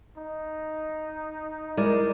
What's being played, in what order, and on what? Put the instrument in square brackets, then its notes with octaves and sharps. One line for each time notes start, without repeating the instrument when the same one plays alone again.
[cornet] D#4
[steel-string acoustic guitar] G#3 [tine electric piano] E4 A#4 D5